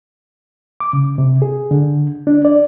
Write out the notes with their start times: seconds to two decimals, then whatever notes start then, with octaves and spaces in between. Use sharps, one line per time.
0.80 D6
0.93 C#3
1.18 C3
1.42 G#4
1.71 D3
2.27 D4
2.45 D5